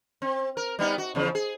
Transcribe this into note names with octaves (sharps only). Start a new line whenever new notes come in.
C4
A#4
G3 B3 D#4
F#4
E2 C#3 F3
G#4